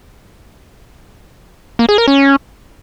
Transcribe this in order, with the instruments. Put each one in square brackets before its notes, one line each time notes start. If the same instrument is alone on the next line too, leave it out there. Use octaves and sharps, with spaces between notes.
[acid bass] A#3
G#4
A#4
C#4